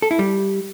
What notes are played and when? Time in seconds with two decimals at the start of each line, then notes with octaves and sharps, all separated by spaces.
0.02 A4
0.11 E4
0.19 G3